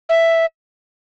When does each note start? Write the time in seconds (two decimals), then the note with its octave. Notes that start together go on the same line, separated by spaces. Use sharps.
0.09 E5